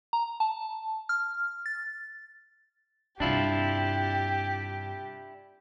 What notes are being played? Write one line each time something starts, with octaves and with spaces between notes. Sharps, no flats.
A#5
A5
F6
A6
G2 C3 D4 E4 F4 G4